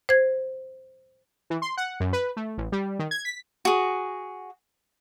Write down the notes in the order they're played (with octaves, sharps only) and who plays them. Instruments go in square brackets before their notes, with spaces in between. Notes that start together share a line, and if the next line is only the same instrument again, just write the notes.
[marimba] C5 G#6
[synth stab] E3
C6
F#5
F#2
B4
A3
A1
G3
D#3
G#6
B6
[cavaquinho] F#4 G#4